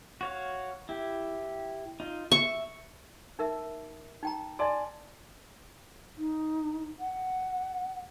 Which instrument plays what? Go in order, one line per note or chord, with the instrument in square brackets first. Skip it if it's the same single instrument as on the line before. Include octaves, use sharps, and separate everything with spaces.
[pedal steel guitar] F#4 C#5 F5
E4 G4
D#4 F4
[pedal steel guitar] E5 [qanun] C#6
[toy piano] D#4 A#4 E5
D#4 G5 A#5
[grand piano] D5 G#5 A5 [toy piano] D#5 C6
[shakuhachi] D#4
F#5